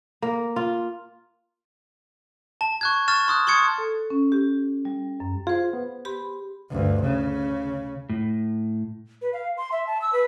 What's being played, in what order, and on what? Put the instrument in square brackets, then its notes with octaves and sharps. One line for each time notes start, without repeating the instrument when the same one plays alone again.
[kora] A#3
F4
[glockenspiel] A5
C#6 F#6 G#6
C#6 F6 A6 E7
C6 D#6 F#6
C6 C#6 D#6 G#6 C#7
[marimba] A4
C#4
G4
G3
F#2
[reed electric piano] F4 [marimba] G#4 C5
[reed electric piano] B3
[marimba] G4 B5 C6
[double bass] D2 G2
C#3
[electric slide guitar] A2
[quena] B4
F5
C6
E5
A5
E6
B4